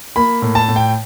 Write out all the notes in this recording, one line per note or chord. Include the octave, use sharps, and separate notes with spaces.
A#3 B5
A2
A5
A2
G5